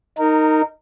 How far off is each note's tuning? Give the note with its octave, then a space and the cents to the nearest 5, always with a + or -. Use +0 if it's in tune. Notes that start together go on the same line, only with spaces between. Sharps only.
D#4 +0 A#4 -20